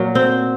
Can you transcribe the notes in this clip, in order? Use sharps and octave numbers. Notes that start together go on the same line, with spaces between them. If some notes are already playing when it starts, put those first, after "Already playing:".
Already playing: A#2 F#3
C4